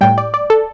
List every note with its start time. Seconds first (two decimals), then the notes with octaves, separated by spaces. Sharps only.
0.01 A2 G3 G5
0.18 D5
0.34 D5
0.50 A4